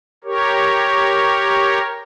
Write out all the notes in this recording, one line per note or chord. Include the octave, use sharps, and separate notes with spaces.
G4 A#4 C#5